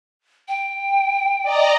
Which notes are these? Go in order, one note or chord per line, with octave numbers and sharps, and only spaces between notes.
G5
D5 D#5 A#5